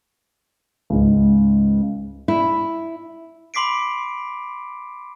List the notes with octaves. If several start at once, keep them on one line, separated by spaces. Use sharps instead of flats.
C#2 G#2
E4
B5 C6 D6 B6 C7 D7